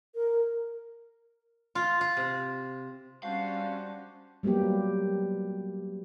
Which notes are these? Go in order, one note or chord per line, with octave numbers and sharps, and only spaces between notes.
A#4
F4
F4
C3
G3 C#4 D4 F#4 C5 F5
F#3 G3 A#3 B3 G4